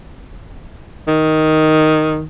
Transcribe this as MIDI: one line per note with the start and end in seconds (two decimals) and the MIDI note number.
1.08 2.23 51